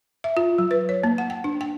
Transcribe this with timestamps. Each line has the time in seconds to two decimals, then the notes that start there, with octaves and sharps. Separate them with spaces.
0.24 E5
0.37 F4
0.58 F#3
0.71 B4
0.89 C#5
1.03 A#3
1.18 F#5
1.30 G5
1.44 D4
1.61 G5